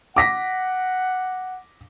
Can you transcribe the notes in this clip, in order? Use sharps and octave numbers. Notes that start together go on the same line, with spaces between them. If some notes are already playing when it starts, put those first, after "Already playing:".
F#5 D6 A#6 B6